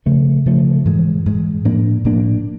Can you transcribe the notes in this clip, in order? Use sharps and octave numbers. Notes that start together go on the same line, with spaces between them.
C#3 F3 A3
C#3 F3 A3
G#2 E3 G#3
G#2 E3 G#3
A2 F3 A#3 D4
A2 F3 A#3 D4